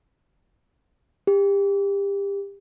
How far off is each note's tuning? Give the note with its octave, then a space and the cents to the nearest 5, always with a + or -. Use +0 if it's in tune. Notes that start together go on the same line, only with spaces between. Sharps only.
G4 +30